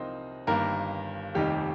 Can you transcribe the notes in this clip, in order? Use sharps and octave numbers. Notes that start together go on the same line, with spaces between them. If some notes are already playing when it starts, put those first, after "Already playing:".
Already playing: C2 C3 F3 A#3 C4 D#4 C5 D#5
G1 G2 D#3 A#3 A#4
F1 D#2 D#3 G3 D#4 G4